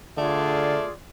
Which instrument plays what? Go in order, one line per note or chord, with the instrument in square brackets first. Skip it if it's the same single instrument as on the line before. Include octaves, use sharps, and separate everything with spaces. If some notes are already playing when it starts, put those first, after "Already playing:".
[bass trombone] D3 [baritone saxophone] A3 [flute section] F4 G#4 [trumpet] D5